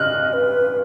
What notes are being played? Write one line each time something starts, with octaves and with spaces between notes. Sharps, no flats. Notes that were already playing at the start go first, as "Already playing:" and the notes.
Already playing: D#5 F6 F#6
B4